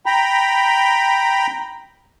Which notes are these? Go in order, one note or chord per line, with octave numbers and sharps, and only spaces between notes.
G5 A#5 B5